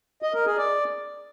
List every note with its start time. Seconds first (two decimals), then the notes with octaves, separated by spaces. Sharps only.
0.22 D#5
0.34 A#4
0.46 G#4
0.57 D5